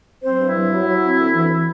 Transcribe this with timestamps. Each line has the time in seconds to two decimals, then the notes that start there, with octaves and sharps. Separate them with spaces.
0.23 F#3 C4 C5
0.39 G2
0.47 E4
0.56 F#3
0.71 F#3
0.86 F#3
1.03 C4
1.19 D2
1.34 E3